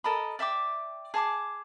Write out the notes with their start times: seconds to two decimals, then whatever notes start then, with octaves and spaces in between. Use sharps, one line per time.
0.04 A4 A#4 D#5 B5
0.39 D5 E5 G5 D6
1.14 G#4 A5 C#6 D6